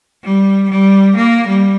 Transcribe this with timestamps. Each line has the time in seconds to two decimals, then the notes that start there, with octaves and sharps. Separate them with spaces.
0.24 G3
0.70 G3
1.16 A#3
1.47 G3